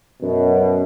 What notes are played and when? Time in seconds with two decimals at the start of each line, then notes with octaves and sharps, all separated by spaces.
0.22 F#2 B2